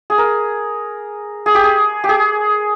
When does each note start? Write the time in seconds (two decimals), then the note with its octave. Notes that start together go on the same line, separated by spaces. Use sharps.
0.10 G#4
0.18 A#4
1.46 G#4
1.55 G4
1.64 G#4
2.04 G4
2.09 G#4